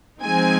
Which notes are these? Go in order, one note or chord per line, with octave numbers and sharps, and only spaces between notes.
F3 G#3 C4 D#4 G#5